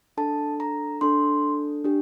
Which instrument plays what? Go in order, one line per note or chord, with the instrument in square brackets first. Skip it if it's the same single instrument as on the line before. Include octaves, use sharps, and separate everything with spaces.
[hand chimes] D4 A4 A5
A#5
D4 A4 C6
D4 G4